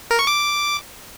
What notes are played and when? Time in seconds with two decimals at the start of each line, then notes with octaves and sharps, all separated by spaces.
0.11 A#4
0.19 C#6
0.27 D6